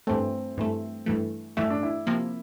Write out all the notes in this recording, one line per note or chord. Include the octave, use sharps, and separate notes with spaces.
G2 E3 A3 C4
G2 E3 A3
G2 E3 A3
G2 E3 A3 E4
D4
E4
C3 F3 A#3